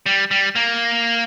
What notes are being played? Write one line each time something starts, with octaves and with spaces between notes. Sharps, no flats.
G3
G3
A#3